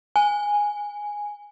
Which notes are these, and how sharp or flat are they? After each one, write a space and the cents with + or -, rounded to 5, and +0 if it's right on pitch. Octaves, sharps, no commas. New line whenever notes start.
G#5 -5